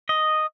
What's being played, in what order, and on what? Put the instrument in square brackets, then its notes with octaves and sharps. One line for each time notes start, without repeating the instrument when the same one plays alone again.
[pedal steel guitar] D#5